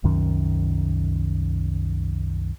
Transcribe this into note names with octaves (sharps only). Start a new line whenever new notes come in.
C2 F#2 D#3 C#4